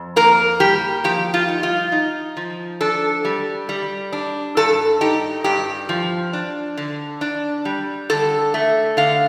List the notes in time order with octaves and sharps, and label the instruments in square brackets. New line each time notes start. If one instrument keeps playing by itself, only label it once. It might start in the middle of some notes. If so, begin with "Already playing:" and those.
Already playing: [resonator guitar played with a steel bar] F2
A#3 A#4
G3 G4
F3 G4
F4
D#4
F4
D#4
F3
D4 A4
G3
G3
D4
G2 A4
D#4 G4
G2 G4
F3
D4
D3
D4
G3
D3 A4
A3
D3 F5